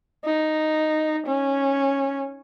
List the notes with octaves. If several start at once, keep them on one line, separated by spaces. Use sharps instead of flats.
D#4
C#4